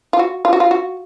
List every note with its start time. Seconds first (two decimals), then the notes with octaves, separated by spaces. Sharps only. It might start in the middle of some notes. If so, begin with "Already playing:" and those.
0.13 F4
0.19 F#4
0.45 F4
0.53 F#4
0.60 F4
0.71 F#4